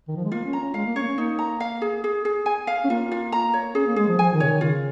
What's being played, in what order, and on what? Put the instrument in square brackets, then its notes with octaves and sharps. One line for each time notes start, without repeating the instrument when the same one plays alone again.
[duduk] D#3
F3
G#3
[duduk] A#3 [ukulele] F4
[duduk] C#4
[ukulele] A#5
[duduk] C#4
[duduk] G#3 [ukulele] F5
[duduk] A#3
[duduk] C#4 [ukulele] C#5
[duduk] A#3
C#4
[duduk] A#3 [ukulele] D#4
[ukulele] A#5
F5
G#4
G#4
G#4
G#5
F5
[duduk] C#4
[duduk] A#3 [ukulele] F4
[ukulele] F4
A#5
C#5
[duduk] C#4 [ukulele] G#4
[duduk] A#3
[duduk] G#3 [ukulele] G#4
[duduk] F3
[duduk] F3 [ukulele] G#5
[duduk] D#3
[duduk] C#3 [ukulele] C#5
[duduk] D#3
[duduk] C#3 [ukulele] F4